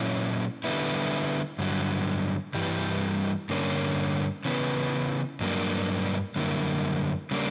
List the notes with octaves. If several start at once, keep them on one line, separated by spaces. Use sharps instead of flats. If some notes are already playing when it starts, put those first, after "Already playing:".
Already playing: A#2 F#3 C#4 E4
D3 G3 B3 E4
G2 D3 F#3
G2 E3 G3
G2 D3 A#3 C#4
C#3 E3 B3
G2 F#3 A#3 D4
F#2 D3 G3 A#3 E4
C#3 G3 A#3 D4